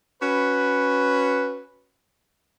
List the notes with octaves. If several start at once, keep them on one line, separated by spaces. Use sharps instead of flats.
C#4 F#4 B4